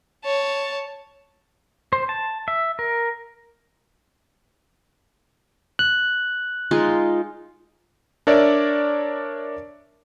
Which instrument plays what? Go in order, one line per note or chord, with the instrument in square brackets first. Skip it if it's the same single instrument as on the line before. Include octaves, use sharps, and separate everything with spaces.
[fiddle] C#5 A5
[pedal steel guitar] C5
A5
E5
A#4
[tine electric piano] F#6
[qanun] G#3 D#4 F4
[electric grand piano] D4 A#4 C#5 D5 E5